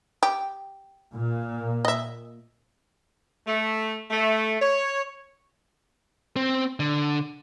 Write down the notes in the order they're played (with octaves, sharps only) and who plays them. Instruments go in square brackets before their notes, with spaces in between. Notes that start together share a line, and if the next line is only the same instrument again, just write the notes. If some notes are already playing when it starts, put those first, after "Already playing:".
[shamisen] G4
[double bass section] A#2
[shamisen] D#5 E5
[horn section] A3
A3
C#5
[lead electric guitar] C4
D3